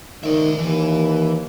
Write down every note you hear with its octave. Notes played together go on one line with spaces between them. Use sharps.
D#3 D5 E5
D#2 E3